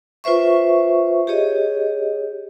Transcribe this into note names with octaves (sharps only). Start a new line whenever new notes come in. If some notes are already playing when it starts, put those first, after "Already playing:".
F4 B4 C5 E5 C#6
G4 G#4 C#5 D#5